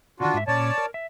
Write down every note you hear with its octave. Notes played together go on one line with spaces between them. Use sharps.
C3 D#3 D4 F4 F#4
G#2 E5
A#2 C#4 C#5 D5 A5
A#4
E5